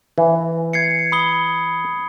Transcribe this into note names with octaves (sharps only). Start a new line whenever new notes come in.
E3
G#6 C7 C#7
B5 D#6 G7